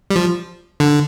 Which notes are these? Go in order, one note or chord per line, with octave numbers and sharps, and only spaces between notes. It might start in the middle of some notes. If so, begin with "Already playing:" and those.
G3
F3
D3